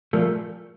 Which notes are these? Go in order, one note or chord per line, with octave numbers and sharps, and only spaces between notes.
A#2 F3 A3